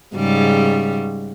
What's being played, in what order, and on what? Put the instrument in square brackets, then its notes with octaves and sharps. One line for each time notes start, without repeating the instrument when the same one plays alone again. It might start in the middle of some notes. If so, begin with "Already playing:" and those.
[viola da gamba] G#2 C#3 G3